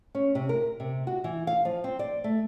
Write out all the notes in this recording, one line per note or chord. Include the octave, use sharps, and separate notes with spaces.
C#4
C3
A#4
C3
F#4
E3
F5
F3
C4
D5
A3